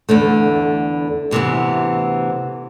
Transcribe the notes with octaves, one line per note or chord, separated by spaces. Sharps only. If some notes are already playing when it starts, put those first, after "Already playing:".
E2 D3 A3
D2 C3 E3 B3